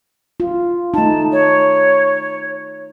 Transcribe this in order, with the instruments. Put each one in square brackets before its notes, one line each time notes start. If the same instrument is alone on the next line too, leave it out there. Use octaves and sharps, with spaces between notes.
[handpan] F4
[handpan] A3 D#4 [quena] A5
[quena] C#5